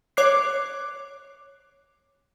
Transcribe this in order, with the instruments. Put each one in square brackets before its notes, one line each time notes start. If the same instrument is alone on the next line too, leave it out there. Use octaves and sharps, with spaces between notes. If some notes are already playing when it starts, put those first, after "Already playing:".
[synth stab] C#5 D6 F#6 C7